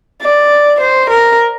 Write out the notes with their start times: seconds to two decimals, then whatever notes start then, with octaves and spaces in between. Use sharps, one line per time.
0.22 D5
0.81 C5
1.10 A#4